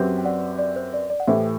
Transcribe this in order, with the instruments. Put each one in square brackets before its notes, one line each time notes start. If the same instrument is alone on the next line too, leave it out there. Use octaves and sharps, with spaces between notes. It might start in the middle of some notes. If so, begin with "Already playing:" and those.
Already playing: [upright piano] F#2 F#3 C4 G4 B4
[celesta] G5
D5 F#5
D5
C5
D5
D5
F#5
[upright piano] A2 E3 A3 E4 G4 [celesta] C5 E5